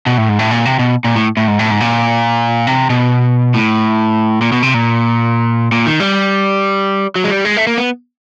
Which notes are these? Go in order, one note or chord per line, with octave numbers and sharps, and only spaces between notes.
B2
A2
G#2
A2
A#2
C3
B2
A#2
A2
A2
G#2
A2
G#2
A#2
C3
B2
A2
A#2
B2
C3
A#2
A#2
D#3
G3
F#3
G#3
G3
G#3
A3
A#3
B3